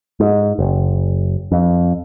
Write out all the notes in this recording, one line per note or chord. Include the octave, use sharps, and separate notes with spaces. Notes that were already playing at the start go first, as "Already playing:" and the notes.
G#2
F#1
F2